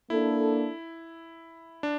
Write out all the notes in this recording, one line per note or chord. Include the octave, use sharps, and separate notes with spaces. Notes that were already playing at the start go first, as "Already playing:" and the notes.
A#3 D4 E4 A4
D4